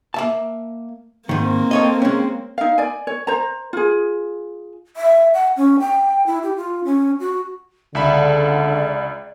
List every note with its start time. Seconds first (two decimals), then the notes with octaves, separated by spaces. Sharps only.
0.14 A#3 E5 A5
1.29 G#2 D#3 A#3 C4
1.71 A4 C#5 D#5
2.02 G#3 C#4
2.58 D#4 F5
2.78 D5 G#5
3.07 C#5
3.27 C5 A#5
3.73 F4 G#4
4.97 E5
5.34 F#5
5.57 C#4
5.80 G5
6.26 E4
6.43 G4
6.56 F4
6.85 C#4
7.20 F#4
7.95 C#2 D3 D5 E5 B5